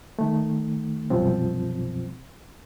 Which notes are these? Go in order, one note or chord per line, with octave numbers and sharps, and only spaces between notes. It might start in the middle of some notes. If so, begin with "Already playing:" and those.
D#3 A3
C2 F#2 B2 F3 C4